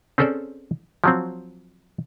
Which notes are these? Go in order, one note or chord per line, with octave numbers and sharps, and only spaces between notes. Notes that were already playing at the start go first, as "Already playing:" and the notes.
C4 C#4 G#4 A4 C5 D5
F3 F#3 C4